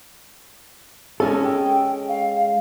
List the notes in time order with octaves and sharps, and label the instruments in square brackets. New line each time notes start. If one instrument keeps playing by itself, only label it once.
[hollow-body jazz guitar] G#3 C#4 A4
[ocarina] G5
F5